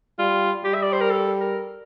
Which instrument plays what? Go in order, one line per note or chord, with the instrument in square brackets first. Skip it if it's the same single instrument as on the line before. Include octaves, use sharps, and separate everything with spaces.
[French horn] G3 [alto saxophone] F4
[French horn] G3 [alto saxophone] G4
[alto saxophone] E5
D5
C5
A#4
A4
A#4